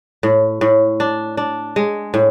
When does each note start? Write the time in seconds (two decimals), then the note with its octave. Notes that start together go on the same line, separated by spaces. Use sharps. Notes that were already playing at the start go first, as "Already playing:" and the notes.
0.23 A2
0.61 A2
1.00 D4
1.37 D4
1.76 G#3
2.14 A2